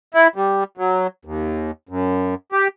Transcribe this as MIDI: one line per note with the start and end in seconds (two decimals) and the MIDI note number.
0.14 0.28 64
0.36 0.64 55
0.77 1.07 54
1.25 1.71 39
1.89 2.35 42
2.52 2.68 67